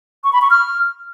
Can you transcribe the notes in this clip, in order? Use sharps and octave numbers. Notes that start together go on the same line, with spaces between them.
C#6
B5
C#6
F6